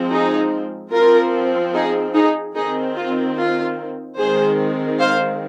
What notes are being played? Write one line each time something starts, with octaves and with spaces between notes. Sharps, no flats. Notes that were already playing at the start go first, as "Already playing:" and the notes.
Already playing: F3 G#3 C4
D#4 G#4
F3 C4 F4 A#4
D#4 G#4
D#4 G#4
D#3 C4 D#4 G#4
F4
F4
D#3 G#3 C4 G#4 C5
C5 F5